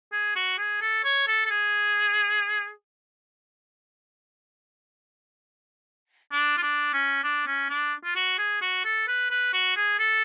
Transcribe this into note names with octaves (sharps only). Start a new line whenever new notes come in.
G#4
F#4
G#4
A4
C#5
A4
A4
G#4
D4
F4
D4
C#4
D4
C#4
D4
F4
F#4
G#4
F#4
A4
B4
B4
F#4
G#4
A4